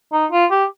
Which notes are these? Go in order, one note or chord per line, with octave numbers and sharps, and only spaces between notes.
D#4
F4
G4